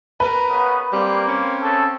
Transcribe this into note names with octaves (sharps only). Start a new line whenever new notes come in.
A#4 B4
C#3 B3
G3 A#3 C4
C#4
C#3 A4